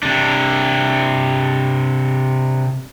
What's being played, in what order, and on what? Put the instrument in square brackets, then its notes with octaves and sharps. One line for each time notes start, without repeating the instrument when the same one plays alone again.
[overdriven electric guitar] C3 D4